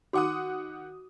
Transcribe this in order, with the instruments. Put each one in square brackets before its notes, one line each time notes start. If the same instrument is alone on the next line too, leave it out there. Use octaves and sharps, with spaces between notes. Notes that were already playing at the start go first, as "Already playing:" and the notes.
[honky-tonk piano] D#3 F#5 D#6 [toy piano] F#4 D6